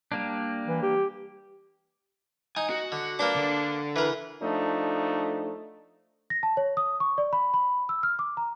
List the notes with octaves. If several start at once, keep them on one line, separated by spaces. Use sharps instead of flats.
G3 A#3 D4
E3
G4
D#4 G#5
F#4
D3
A#3 D4 B4 D6
D3
E3 A#4 B4
F3 A3 D4 D#4
A#6
A5
C#5
D#6
C#6
D5
B5
B5
E6
F6
D6
A#5